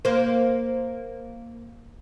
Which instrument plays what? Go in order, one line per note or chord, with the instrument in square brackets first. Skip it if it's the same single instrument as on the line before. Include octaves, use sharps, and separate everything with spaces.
[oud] A#3 C5